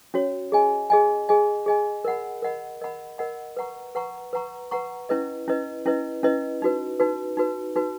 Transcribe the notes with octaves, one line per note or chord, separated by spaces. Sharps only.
C#4 F#4 C#5
G#4 D#5 G#5
G#4 D#5 G#5
G#4 D#5 G#5
G#4 D#5 G#5
A#4 D#5 F#5 B5
A#4 D#5 F#5 B5
A#4 D#5 F#5 B5
A#4 D#5 F#5 B5
B4 F#5 A#5 C#6
B4 F#5 A#5 C#6
B4 F#5 A#5 C#6
B4 F#5 A#5 C#6
C#4 E4 B4 D#5
C#4 E4 B4 D#5
C#4 E4 B4 D#5
C#4 E4 B4 D#5
D#4 F#4 B4
D#4 F#4 B4
D#4 F#4 B4
D#4 F#4 B4